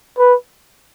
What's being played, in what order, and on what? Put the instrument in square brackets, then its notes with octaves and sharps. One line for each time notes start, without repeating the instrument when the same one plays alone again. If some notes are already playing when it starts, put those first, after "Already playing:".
[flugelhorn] B4